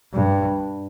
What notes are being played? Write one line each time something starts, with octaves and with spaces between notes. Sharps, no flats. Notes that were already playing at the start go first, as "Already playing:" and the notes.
G2